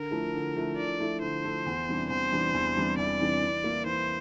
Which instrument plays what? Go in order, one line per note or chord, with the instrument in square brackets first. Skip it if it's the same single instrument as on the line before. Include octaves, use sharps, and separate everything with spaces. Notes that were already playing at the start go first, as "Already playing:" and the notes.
Already playing: [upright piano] D3 [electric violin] A#4
[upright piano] F3 A3 E4 A4
D3
F3 A3 E4 A4
[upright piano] D3 [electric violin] D5
[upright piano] F3 A3 E4 A4
[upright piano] D3 [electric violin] C5
[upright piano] F3 A3 E4 A4
E2
C3 E3 G3 D4
[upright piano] E2 [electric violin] C5
[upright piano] C3 E3 G3 D4
E2
C3 E3 G3 D4
[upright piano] E2 [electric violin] D5
[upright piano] C3 E3 G3 D4
E3
A#3 E4
[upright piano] E3 [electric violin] C5